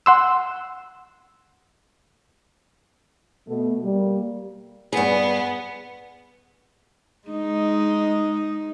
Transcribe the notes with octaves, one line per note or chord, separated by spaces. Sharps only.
F#5 C6 E6
B2 A3
G3 A#3
G2 B3 G#4
G#3 D#4